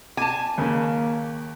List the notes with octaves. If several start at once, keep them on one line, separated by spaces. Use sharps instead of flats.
G#5 A5 D6
D#2 C#3 A#3